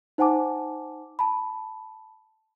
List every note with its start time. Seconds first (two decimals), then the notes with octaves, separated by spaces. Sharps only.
0.18 D#4 C5 F#5 G#5 A5 D6
1.19 A5 B5